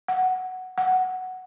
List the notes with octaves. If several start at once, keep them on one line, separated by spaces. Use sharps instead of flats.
F#5
F#5